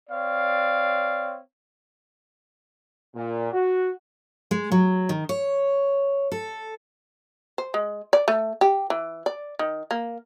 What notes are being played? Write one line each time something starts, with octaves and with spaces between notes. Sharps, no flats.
C4 C#5 D5 F5
A#2
F#4
G#3
F#3
D#3
C#5
A4
C5
G#3
D5
A3
G4
E3
D5
D#3
A#3